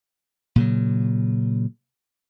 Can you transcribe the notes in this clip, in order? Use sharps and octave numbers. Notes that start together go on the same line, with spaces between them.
A#2 C#3 F#3